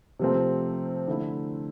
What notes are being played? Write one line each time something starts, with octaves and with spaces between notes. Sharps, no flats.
C3 F3 A3 C4
D3 A3 E4